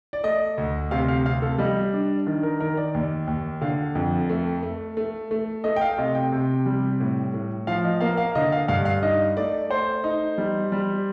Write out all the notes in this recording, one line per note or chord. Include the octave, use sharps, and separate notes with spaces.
D5
A3 D#5
D2
C3 F5
F5
C3 F5
A4
G3 D#5
D4
D#3
A#4
D#3 A#4
D5
D#2
D#2
D3 F5
F2
A3
A3
A3
A3
A3 D#5
G5
F5
C3 D#5
G5
C3
G3
A2
A2
F3 F5
D#5
A#3 F5
F5
D3 D#5
F5
G2 F5
F5
D#4 D#5
A3 D5
A3 C5
D#4
G3
G3